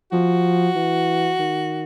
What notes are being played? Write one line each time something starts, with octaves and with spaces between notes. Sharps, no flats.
F3 F#4
E3
D#3